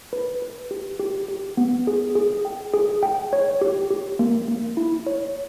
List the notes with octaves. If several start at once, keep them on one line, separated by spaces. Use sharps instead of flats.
B4
B4
G4
G4
G4
B3
G#4
G#4
G5
G#4
G5
C#5
G4
G4
A#3
A#3
E4
C#5